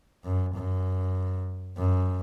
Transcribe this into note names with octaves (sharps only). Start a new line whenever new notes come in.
F#2
F#2
F#2